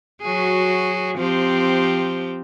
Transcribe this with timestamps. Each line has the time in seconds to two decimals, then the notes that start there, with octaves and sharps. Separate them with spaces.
0.22 F#3 F#4 G#4
1.17 F3 C4 G4